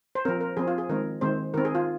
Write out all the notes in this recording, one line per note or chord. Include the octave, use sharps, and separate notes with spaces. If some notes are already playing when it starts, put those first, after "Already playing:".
C5
F3 C4 A#4
A#4
F3 C4 G#4
F4
G#4
D#3 G#3 C4 A#4
D#3 G#3 C4 C5
D#3 C4 A#4
G#4
F4